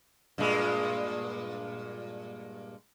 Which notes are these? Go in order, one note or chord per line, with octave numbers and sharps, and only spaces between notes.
G2 A#2 G#3